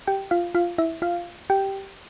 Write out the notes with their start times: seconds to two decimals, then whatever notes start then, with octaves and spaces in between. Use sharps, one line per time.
0.07 G4 G5
0.31 F4 F5
0.55 F4 F5
0.78 E4 E5
1.02 F4 F5
1.50 G4 G5